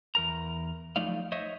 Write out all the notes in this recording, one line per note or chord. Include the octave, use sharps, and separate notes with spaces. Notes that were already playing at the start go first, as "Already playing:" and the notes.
E2 A#4 A#5
F3 F#3 A3 D#4 D5 F5
C5 C#5 D#5 E5